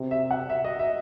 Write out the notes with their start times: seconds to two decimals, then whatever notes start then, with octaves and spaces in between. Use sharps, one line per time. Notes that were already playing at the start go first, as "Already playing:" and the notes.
Already playing: C3
0.11 E5
0.31 F#5
0.50 E5
0.64 D#5
0.79 E5